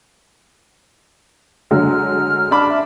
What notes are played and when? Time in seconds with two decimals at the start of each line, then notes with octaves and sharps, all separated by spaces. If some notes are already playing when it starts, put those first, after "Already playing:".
1.71 D3 F#3 G#3 F6
2.51 D4 A5 B5 D6
2.69 E5